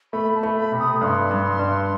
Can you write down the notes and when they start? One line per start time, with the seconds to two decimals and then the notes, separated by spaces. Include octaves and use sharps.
0.13 A3 B5
0.35 A5
0.43 A3
0.57 B5
0.72 C3
0.80 D#6
1.01 G2 C6 D#6
1.31 G2
1.59 G2